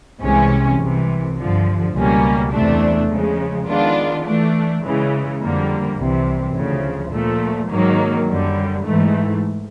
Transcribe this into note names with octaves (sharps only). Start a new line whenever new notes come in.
C2 C3 E3 G#3 C#4
C2 C3 E3
G2 D3 F3
C#2 B2 G3 A#3 C#4
E2 C3 E3 A3 D4
C#3 F3 G#3
D#3 G#3 B3 D4 F4
E3 A3 D4
C#3 E3 G#3
F2 D3 G3 A#3
C2 C3 E3
D2 C#3 F3
A#2 F3 A3
G#2 D#3 F#3 A#3
F#2 D3 G3
G#2 E3 A3